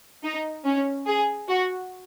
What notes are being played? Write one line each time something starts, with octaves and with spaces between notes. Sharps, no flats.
D#4
C#4
G#4
F#4